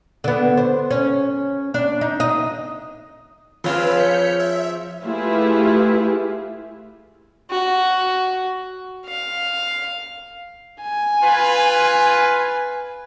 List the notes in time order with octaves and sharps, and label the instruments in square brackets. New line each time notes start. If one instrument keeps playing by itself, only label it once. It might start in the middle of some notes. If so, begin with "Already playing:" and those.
[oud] D3 B3
C5
C#4
D4
D#4
D#5
[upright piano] F3 [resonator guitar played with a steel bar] C4 F4 G#4 [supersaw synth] B4 F5 E6 [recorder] C#5
[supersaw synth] G6 B6 C#7
E5
[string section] A3 E4 F4 G4 G#4 B4
[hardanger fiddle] F#4
F5
[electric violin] G#5
[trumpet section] F4 B4